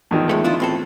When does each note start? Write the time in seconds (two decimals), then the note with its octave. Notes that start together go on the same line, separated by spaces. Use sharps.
0.11 E2 D#3 F3
0.29 G#3 A3
0.44 D4 E4 F4
0.60 A2 C4 A4